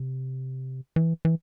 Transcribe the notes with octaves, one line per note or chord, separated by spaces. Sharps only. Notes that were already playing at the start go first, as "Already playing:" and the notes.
Already playing: C3
E3
E3